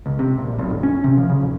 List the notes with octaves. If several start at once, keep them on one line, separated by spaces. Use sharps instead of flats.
C#2
C3
A#1
B1
G1
C#4
C3
F3
C#3
D#1